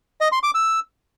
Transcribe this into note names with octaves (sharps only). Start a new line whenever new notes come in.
D#5
C6
D6
E6